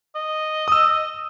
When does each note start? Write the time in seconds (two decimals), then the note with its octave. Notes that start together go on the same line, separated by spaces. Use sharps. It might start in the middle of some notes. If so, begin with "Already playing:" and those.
0.15 D#5
0.68 D#6 E6